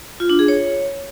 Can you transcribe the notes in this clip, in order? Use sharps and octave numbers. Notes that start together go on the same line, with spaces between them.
F4
D4
G#4
C#5